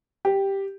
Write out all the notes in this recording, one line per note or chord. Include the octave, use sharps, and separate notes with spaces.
G4